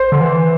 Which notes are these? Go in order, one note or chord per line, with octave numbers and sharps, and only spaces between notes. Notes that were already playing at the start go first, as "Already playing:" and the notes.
Already playing: C5
D3
E3